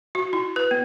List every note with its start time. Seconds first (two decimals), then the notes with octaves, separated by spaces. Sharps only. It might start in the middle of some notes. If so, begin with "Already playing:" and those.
0.15 F#4
0.33 E4
0.56 B4
0.71 B3